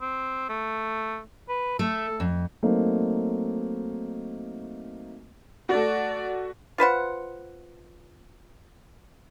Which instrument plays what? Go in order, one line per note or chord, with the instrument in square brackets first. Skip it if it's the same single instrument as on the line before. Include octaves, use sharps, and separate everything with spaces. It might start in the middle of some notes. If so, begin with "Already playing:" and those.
[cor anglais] C4
A3
B4
[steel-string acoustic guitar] A3 [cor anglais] A4
[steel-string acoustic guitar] F2
[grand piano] F#3 A3 A#3 C4 D#4
[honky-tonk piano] A3 F#4 [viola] D5
[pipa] F4 B4 C5 F#5